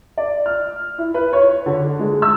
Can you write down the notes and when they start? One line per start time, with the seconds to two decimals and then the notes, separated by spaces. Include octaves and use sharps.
0.17 D5
0.46 F6
0.98 E4
1.14 B4
1.33 C#5
1.66 D3
1.99 G#3
2.22 E6